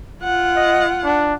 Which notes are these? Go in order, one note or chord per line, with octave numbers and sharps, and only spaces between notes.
F4 F#5
D#5
D4